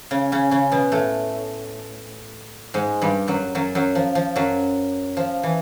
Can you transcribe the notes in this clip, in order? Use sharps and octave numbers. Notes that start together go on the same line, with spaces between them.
C#3 C#4
C#3 C#4
C#3 C#4
B2 B3
A2 A3
G#2 G#3
G2 G3
F#2 F#3
F#2 F#3
F#2 F#3
F3
F3
F#2 F#3
F3
E3